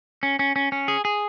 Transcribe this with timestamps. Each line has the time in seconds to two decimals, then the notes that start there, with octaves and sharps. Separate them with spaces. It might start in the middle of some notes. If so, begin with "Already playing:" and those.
0.23 C#4
0.39 C#4
0.56 C#4
0.72 C#4
0.88 G#4
1.05 G#4